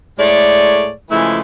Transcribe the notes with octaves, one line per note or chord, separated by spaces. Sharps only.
A2 G#3 A3 C#5 D5
C#3 E3 F3 G#3 A3 E4